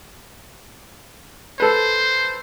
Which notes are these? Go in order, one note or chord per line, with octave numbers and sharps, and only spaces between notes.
A4 B4 C5